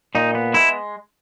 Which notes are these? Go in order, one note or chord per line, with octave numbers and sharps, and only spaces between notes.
A#2 D#4
B3
G#3 E4